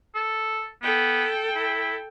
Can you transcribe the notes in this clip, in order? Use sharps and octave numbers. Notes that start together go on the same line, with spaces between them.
A4
B3 A4 G5
E4